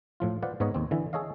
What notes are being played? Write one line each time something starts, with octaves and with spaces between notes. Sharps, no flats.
A2 F3 F4
F4 B4 C5 D5 F#5
G#2 B3 B4 C#5 D#5 A#5
D#2 C4
D3 E3 E4
G#4 A4 C#5 D#5 F5